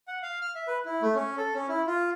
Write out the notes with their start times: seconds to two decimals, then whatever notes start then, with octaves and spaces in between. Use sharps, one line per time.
0.08 F#5
0.22 F5
0.41 F6
0.55 E5
0.67 B4
0.85 E4
1.02 A3
1.15 C#4
1.38 A4
1.54 C#4
1.69 E4
1.87 F4